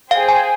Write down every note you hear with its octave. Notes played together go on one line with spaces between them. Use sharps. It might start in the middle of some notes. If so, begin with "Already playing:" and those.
G#4 C5 F5 G5
G#5